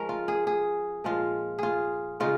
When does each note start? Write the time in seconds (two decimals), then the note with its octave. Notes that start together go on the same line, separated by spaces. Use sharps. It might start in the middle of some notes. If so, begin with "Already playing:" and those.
Already playing: F3 G#3 C#4 A#4
0.09 F4
0.28 G#4
0.47 G#4
1.04 A#2 F3 G#3 F4
1.58 F4 G#4
2.20 C#3 G#3 D#4 F4